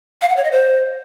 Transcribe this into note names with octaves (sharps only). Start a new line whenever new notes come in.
F5
F#5
C#5
D#5
C5